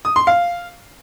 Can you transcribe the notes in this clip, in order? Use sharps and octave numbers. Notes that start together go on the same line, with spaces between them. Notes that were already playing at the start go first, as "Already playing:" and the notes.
D#6
C6
F5